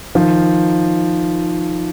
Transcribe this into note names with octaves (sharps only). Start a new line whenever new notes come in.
D#3 F3